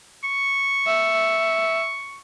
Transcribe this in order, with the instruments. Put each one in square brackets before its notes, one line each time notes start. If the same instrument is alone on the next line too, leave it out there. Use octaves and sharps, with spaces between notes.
[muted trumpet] C#6
[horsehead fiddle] E5